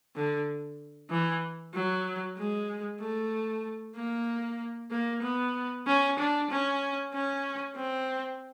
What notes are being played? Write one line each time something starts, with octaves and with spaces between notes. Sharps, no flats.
D3
E3
F#3
G#3
A3
A#3
A#3
B3
C#4
D4
C#4
C#4
C4